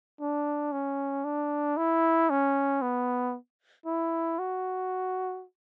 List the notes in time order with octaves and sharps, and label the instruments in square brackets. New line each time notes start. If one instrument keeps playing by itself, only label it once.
[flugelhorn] D4
C#4
D4
E4
C#4
B3
E4
F#4